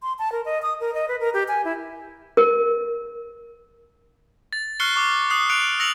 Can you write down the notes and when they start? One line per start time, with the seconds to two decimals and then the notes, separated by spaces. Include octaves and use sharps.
0.02 C6
0.19 A5
0.32 A#4
0.45 D#5
0.62 D#6
0.81 A#4
0.95 D#5
1.08 B4
1.20 A#4
1.34 G4
1.48 G#5
1.65 E4
2.37 A#4
4.53 A6
4.80 C#6 F6 F#6 C7 C#7 G7
4.96 C#6 D6
5.30 D#6 F#6 C7
5.49 F#6 C#7 D7 F7
5.80 E6 A#6 C#7 F7 F#7